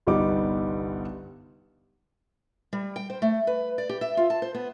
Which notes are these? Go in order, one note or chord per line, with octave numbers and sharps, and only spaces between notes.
G1 C2 G3 B3 D#4 D6
G3
G5
C5
A3
B4
D5
G4
E5
F4
A5
C5
B3